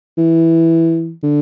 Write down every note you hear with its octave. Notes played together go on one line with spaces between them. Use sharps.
E3
D3